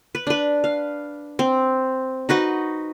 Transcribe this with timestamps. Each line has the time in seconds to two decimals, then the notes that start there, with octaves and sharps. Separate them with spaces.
0.15 B4
0.27 D4 B4
0.64 F5
1.39 C4
2.29 D#4 F#4 B4 D#5